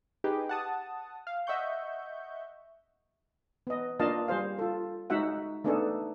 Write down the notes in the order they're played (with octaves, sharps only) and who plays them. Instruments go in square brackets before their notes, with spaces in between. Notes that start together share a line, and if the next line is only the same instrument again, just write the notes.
[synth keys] D#4 G4 G#4 B4
F#5 A5 D#6
F5
D#5 E5 F#5 C#6 G6
[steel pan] B3 D#5
A#3 D4 F4 D#5 F5 A5
G3 G#4 C5 F5
F4 A4
G#3 D#4 F#4 E5 F#5
A3 B3 D4 D#4 G#4 A4